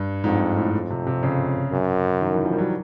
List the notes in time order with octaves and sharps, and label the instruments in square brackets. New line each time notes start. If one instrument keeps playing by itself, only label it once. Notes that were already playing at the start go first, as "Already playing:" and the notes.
Already playing: [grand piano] G2
[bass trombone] F2 [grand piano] G#2
[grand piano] G#2
A2
[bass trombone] F2
[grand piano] C3
C3
C#3
[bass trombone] F#2
[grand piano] D#3
E3
F3
G3
F#3